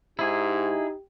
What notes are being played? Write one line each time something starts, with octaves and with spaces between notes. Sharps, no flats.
G#2 D#4 E4 G4 G#4